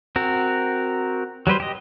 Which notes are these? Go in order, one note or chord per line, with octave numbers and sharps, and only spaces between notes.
C4 F#4 A#4
F#3 G3 B4 C5
G4 D#5